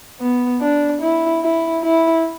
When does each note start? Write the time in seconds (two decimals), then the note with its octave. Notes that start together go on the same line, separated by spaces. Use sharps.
0.21 B3
0.61 D4
1.02 E4
1.42 E4
1.83 E4